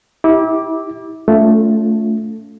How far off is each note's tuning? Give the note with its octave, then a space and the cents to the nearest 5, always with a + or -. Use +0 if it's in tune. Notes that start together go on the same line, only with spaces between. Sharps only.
E4 -35 G4 +0 D6 +0
A3 +0 C#4 +40 F4 +5